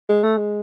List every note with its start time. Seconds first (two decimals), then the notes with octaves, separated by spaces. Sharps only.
0.09 G#3
0.23 A3
0.38 G#3